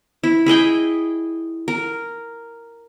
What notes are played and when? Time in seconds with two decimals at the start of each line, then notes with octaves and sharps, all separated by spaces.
0.24 E4
0.46 E4 G#4 D#5 G5
1.68 A#4